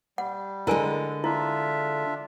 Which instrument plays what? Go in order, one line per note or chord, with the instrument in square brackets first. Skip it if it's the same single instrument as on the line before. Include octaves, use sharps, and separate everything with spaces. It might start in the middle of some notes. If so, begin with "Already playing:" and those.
[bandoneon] G3 [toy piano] F#5
[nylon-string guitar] D3 G#3 [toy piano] E4 A#4 G#5
[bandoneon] D4 F4 E5 [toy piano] E4